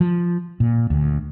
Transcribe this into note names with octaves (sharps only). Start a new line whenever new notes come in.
F3
A#2
D2